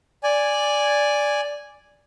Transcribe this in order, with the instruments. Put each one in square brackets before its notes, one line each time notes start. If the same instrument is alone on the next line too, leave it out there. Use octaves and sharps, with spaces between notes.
[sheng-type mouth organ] D5 G#5